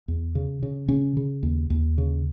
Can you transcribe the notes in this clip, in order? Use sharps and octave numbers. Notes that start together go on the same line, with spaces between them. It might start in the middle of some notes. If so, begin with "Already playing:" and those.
E2
C#3
C#3
C#3 C#4
C#3
D#2
D#2
C#3